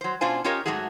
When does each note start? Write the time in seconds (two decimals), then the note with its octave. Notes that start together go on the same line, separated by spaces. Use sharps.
0.01 F#3 C5
0.21 B2 C#4 D4 F4 C5 G#5
0.44 C#4 F4 G4 A#4 C#5 D#5
0.66 G#2 F3 F#3 A3 F#4 G#4